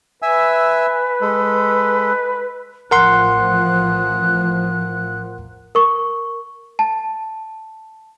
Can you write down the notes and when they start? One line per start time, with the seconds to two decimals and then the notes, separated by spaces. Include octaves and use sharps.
0.22 B4 E5 G#5 E6
1.21 G#3 A4
2.91 A1 F3 A#4 F#5 C6 F#6
5.75 A#4 C#6
6.79 A5